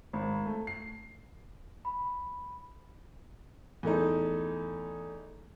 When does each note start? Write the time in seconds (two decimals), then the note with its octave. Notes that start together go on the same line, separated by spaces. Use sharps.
0.13 G#1
0.46 A3
0.67 C7
1.85 B5
3.83 E2 A3 D#4